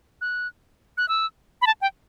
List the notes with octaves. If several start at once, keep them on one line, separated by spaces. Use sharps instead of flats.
F#6
F#6
E6
B5
A5
G5